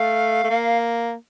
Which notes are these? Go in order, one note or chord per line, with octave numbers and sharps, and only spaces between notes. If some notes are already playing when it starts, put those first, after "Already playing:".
Already playing: A3 F5
A3
A#3